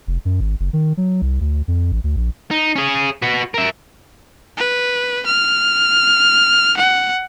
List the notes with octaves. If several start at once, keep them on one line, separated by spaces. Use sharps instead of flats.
F1
F#2
G#1
F#1
D#3
F#3
C2
D2
F2
A1
D2
A#1
D#4
C#4 G#4
F#4 B4
A#4 E5
B4
F6
F#5